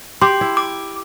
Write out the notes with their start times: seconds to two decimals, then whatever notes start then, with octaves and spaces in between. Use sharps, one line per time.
0.22 G4 C6 D6
0.41 E4
0.57 D6